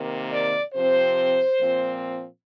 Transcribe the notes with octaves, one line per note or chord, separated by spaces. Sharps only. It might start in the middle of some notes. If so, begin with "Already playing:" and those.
Already playing: C3 D#3 A#3
D5
C3 F3 C4 C5
A#2 F3 C4